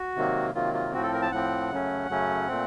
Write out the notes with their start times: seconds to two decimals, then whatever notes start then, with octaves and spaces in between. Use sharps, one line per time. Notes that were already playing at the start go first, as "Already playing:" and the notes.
Already playing: F#4
0.16 C3 D#3 F#3 A#3
0.55 C3 D#3 F#3 A#3 F4
0.74 F4
0.93 A2 F3 C4 F#4
1.03 A4
1.13 A#4
1.22 A5
1.32 A2 F3 C4 F#5
1.70 F#2 C#3 F#3 A3 C#4
2.09 F#2 C#3 F#3 A3 C#4
2.47 A#2 A3 C4